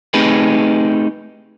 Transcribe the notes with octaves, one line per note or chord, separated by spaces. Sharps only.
A3 C4 D#4 G4 G#4 B4